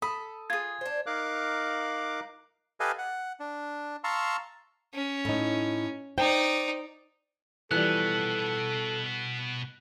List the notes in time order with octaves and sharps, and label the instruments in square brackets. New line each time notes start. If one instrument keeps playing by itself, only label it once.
[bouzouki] A4 [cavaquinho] B5 [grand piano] D#6
[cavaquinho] F4 G#4 [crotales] G#6
[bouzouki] D4 C5
[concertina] D#4 A#4 F5 D6 F#6
G4 A4 B4 D#5 F5 G#5
F#5
D4
F5 A5 A#5 C6 C#6 E6
[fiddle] C#4
[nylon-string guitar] A2 D#4
[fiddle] D#4 D5 [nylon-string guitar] C5 G5
[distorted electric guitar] B2 B3 [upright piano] E3 F3 G3 [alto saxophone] A4 [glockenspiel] F#6